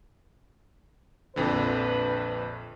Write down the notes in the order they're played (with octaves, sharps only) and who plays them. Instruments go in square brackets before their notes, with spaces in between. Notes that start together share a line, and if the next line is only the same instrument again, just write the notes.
[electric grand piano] A#1 F2 D3 [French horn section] B4